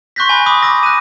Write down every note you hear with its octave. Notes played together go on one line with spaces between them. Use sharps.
C6 C#6 F#6 G6 A#6 B6
G#5 B5
B5 D6 D#6
D6 E6 A#6
F#6 D#7